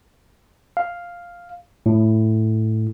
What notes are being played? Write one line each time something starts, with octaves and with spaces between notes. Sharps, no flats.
F5
A2